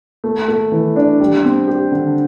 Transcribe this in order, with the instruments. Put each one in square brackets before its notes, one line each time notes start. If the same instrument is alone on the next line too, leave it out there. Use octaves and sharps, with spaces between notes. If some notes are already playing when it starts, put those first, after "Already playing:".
[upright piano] A3
A3
E3
D4
G3
C4
G4
D3